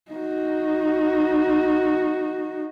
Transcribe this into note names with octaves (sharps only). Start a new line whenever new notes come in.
D#4 F#4